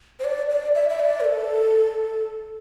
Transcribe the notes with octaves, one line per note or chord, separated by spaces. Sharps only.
C5
D5
D5
E5
E5
D5
A#4
A4